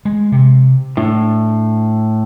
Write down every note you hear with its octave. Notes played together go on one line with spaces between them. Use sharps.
G#3
C3
A2 D4